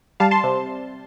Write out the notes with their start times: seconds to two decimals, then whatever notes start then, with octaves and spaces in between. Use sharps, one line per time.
0.20 G3 F5 A5
0.31 A5 C6
0.44 C3